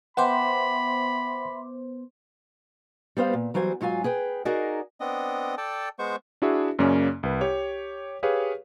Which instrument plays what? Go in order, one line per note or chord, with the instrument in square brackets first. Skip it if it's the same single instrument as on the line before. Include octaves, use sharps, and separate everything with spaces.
[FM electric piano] B3 C5 [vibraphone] E5 C6 D6 [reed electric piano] F#5 G5 [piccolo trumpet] B5
[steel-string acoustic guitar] G3 B3 C5 F5
A#2
E3 F#3 G3 C5 G#5
G#2 F#3 F4 G#5
G#4 B4 G5
D#4 F#4 G#4 A#4 D5 D#5
[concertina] B3 C4 D4 D#5
A4 D5 G5 A5
G#3 B3 C5 C#6
[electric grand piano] D4 E4 F#4 G#4 E5
F#2 C#3 A#3 C#4 D5
C2 B4
G4 C#5
G4 G#4 B4 C#5 F5